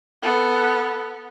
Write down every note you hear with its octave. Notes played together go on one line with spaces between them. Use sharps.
B3 A4